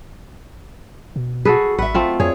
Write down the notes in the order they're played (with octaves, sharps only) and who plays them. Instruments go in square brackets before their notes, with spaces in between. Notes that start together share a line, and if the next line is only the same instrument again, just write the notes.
[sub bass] B2
[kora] F#4 A4 B4 [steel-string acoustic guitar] G#4
[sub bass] A1 [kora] B4 [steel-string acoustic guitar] E5 F#5
[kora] A3 C4 F4
[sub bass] F2 [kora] G#4 [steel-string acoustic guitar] C#5